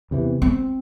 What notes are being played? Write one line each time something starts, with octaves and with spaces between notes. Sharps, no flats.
E2 C3 E3
C4